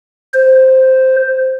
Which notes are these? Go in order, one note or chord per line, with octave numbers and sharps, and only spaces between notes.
C5